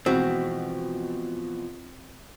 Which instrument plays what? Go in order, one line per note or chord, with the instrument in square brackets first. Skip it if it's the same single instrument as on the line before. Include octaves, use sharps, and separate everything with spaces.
[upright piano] B2 E3 B6 [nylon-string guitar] F3 G#3 F#4 [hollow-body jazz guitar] C4